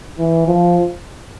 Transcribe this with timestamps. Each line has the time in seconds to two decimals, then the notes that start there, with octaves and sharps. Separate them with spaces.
0.19 E3
0.47 F3